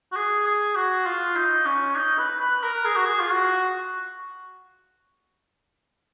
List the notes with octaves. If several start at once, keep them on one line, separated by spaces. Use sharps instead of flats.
F#4
G#4
G#4
F#4
F4
D#4
C#4
D#4
B4
B4
A#4
G#4
F#4
G#4
F4
F#4